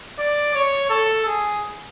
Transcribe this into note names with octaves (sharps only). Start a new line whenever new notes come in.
D5
C#5
A4
G#4